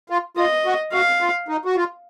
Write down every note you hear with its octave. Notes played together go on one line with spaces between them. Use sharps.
F4
F4 D#5
F#4
F#4 F5
F4
D#4
F#4
F4